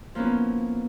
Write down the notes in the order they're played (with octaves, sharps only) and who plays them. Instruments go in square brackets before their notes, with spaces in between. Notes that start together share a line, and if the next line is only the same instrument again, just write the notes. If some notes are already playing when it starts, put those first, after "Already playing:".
[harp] F3 A#3 B3 C#4 E4